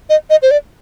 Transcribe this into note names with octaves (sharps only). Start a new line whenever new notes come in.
D#5
D#5
C5
D5